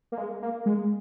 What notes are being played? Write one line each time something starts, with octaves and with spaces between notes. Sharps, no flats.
A#3
G#3
A#3
G#3